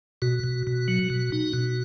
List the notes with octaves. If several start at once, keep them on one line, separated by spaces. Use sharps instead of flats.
B2 F#4
B2
B2
F#3
B2
D#4
B2